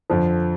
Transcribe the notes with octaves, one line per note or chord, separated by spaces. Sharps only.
F2 D3 F3